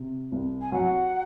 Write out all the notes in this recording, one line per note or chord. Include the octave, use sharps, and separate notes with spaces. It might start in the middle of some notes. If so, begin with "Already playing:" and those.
Already playing: C3
C2
G#5
F#3 F#5